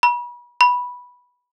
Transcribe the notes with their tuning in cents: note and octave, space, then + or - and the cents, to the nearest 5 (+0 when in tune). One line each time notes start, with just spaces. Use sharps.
B5 -35
B5 -10